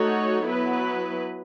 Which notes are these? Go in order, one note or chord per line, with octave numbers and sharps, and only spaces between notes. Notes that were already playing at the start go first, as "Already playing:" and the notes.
Already playing: A3 D#4 F#4 A4 C#5
F#3 B3 E4 B4